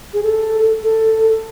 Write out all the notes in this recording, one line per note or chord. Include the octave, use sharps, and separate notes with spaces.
G#4
A4
A4